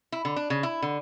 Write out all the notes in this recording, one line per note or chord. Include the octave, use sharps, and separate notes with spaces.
E4
D3
D4
C#3
E4
D3